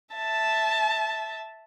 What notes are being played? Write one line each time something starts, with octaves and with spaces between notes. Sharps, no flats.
E5 A5